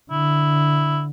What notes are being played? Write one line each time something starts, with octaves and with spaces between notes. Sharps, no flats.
D3 E4